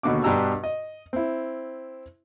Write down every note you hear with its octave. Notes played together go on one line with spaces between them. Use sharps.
D#2 B2 D3 F#4 D6
G2 B2 D4 G4 A#5 E6
D#5
C4 E4